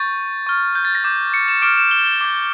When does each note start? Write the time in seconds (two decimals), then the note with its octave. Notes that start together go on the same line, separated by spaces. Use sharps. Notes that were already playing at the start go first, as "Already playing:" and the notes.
Already playing: C#6 G6 A6
0.47 C#6 F6
0.75 G6
0.85 A6
0.95 A#6
1.04 D6 G6
1.34 C#7
1.48 E7
1.62 D6 F6 D7
1.77 E7
1.91 G7
2.06 G7
2.21 D6 G6 G7